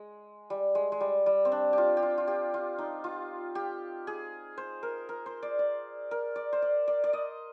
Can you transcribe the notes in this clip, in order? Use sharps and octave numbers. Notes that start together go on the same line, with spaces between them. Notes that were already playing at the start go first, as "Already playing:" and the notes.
Already playing: G#3
G3
G#3
G#3
G3
G3
C4
D4
F4 G4
G4
F4
F4
G4
F4
D#4
F4
G4
G#4
C5
A#4
A#4
C5
D5
D5
A#4
D5
C5
D5
D5
D5
D#5